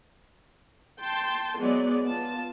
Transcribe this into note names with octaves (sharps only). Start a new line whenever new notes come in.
G5 A5 C6
F#3 G#3 B3 D5
B3 F4 A5